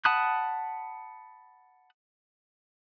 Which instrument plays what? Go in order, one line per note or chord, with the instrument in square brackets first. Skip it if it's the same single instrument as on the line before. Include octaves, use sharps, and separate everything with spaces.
[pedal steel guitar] F#5 A5 B5 D#6 F#6